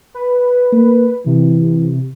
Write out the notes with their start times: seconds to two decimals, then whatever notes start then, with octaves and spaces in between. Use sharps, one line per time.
0.14 B4
0.72 A#3
1.26 C3 E3